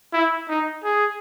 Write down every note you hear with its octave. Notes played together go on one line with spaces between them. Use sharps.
E4
D#4
G#4